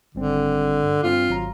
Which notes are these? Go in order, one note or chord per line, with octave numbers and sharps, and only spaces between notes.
G#1 D3 G3 C4
G2
G2 C4 F4 F6
G#1 F#3 A#5